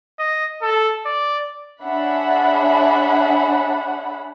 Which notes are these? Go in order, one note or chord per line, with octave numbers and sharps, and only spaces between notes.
D#5
A4
D5
D4 G#4 C#5 E5 F#5 B5